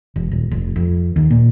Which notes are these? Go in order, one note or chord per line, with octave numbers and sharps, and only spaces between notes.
E1
D#1
F1
F2
D#2
A#2